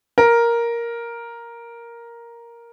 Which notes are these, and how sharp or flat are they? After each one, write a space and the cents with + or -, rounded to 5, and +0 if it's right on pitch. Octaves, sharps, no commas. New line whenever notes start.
A#4 +5